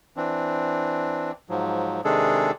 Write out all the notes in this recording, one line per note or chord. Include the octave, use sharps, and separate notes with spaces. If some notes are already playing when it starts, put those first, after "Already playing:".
E3 C4 D4
G#2 F3 F#3
C3 D#3 G#3 D4 G#4 A4